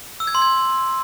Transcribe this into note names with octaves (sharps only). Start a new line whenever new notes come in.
E6
G#6
C6
G#6